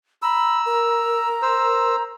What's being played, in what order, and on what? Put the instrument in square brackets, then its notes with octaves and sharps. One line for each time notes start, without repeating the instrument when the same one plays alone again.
[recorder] A#5 [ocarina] B5 [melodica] E6
[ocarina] A#4
[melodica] C5 E6